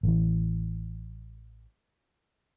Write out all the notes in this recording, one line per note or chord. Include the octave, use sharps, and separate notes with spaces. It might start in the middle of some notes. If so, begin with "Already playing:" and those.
A1 E3